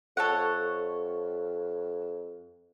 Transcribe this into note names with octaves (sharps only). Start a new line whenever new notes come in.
F2 A4 C#5 F#5